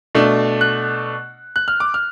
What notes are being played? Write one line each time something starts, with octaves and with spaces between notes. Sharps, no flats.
B2 A3 D4
F#6
F#6
F6
D6
F6